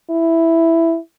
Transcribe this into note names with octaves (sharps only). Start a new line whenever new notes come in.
E4